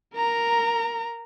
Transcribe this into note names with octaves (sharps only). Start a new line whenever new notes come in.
A#4 A#5